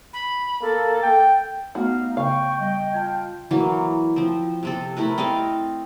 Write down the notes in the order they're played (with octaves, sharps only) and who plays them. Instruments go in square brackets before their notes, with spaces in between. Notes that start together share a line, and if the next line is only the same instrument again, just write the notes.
[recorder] B5
[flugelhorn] A#3 [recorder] A4
[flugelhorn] G5
[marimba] A3 B3 [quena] D#4 [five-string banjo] F#4 [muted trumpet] F5
[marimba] C#3 [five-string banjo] F5 [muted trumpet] G5 [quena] C#6
[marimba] G3 [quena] D#5
[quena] F4 [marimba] A5 G#6
[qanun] E3 F#3 A#3
F3 C4
C3 C4 A4
A3 E4 A#4 B4
C4 A4 D#5 F5